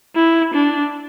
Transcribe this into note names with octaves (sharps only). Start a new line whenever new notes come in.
E4
D4